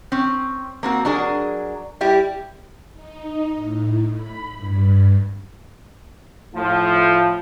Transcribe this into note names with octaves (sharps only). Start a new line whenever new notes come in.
C4 C#4
A#3 C4 F#4
F#3 D4 G#4 A#4
G3 E4 G4
D#4
A2
B5
G2
A2 F3